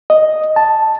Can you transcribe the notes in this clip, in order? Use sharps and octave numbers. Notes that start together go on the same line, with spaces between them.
D#5
A5